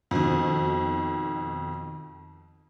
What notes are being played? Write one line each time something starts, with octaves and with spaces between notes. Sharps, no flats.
F2 B2 D#3